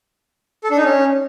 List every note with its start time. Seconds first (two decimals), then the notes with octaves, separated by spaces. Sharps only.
0.64 A4
0.71 D4
0.77 D#4
0.84 C#4